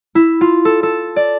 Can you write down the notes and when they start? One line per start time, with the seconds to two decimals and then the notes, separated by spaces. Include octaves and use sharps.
0.15 E4
0.41 F4
0.65 A4
0.83 A4
1.16 D5